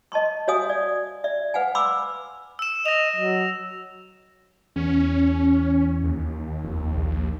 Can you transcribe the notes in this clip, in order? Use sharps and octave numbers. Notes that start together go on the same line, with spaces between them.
D#5 A5 C6 C#6
F#4 C#5 E5 F5 G#5 D#6
D5
D5 E5
B4 F5 F#5 G#5
B5 C6 D6 E6
E6 E7
D#5 A#6 F7
F#3
E2 C#4
D#2
F1
A#1